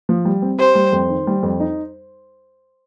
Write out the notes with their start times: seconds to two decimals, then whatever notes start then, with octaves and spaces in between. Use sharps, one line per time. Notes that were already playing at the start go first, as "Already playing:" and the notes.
0.09 F3
0.25 G3
0.42 C4
0.59 G4 C5
0.75 G3
0.93 F2
1.09 D#3
1.27 G3
1.43 F2
1.60 D#4